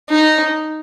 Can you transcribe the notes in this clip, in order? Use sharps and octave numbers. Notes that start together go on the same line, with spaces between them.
D#4